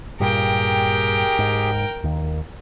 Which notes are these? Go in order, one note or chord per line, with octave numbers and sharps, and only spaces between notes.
G2 A#2 G3 G4 G#4 A#4 G5
G#2
D#2 D#3